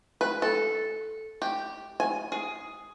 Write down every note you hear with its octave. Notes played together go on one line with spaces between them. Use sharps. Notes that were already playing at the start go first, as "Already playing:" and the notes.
B4
A4
G4
G#5
G#4